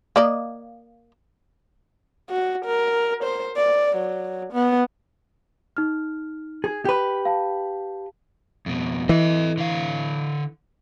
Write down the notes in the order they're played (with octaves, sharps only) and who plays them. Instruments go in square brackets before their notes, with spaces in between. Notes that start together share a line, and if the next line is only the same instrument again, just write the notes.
[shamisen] A#3 D5 D#5
[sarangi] F#4
A#4
C5
D5
F#3
B3
[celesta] D#4 F6
[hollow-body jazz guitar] G#4
G4 B4
[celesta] F5 A5
[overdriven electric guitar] F2 B2
[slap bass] E3 [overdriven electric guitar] A4 D#5
[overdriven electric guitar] D3 F5